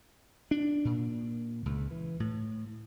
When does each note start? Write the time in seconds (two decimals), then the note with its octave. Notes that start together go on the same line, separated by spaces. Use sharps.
0.51 D4
0.85 A#2
1.66 C#2
1.91 E3
2.20 A2